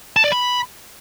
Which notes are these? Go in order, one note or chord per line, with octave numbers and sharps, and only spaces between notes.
A5
D5
B5